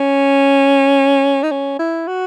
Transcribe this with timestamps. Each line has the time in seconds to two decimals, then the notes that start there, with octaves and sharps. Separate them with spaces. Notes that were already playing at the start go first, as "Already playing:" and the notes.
Already playing: C#4
1.43 D#4
1.51 C#4
1.79 E4
2.07 F#4